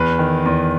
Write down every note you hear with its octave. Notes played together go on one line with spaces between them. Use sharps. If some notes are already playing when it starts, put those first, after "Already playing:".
Already playing: E2 B4
D#3
E2